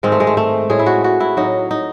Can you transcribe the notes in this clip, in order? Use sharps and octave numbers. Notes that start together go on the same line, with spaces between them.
G#2 D#3 G#3 C4
A3
G#3
A3
A3
A2 G#3 G#4
E4
F#4
F#4
E4
A2 F#3 D#4
D#4